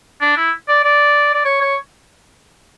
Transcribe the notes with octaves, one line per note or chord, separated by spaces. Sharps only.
D4
E4
D5
D5
D5
C#5
C#5